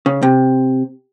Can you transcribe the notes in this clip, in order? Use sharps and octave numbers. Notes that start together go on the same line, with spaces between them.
C#3
C3